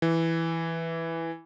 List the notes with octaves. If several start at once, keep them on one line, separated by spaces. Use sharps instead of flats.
E3